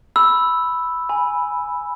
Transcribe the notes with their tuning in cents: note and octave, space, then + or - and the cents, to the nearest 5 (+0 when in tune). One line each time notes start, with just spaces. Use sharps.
B5 +0 E6 +0
G#5 +0 B5 -10